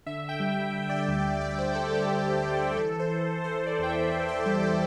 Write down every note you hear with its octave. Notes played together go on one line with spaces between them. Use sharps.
D3 E5
G5
G3
E5
D3
D5
E5
D2
E5
G3 D5
C5
D3 A4
G4
D2
G3
E3 A4
C5
E3
E3 C5
D5
E2 G5
E5
E3 G5
G5
G3 E5
D5